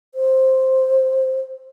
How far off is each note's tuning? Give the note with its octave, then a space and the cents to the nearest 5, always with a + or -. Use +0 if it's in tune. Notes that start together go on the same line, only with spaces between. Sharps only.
C5 +5